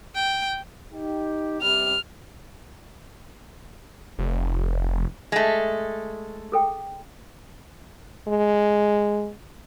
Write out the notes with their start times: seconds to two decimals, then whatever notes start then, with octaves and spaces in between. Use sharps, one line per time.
0.15 G5
0.94 D#4 G4
1.62 C3 G3 F6
4.19 F1
5.32 G#3 A3
6.52 G#4 A4 G5
8.28 G#3